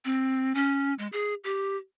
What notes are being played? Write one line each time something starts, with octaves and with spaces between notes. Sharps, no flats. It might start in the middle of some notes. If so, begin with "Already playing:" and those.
C4
C#4
G#3
G#4
G4